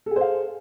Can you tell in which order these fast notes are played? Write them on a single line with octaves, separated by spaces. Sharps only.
A4 G#4 C5 F5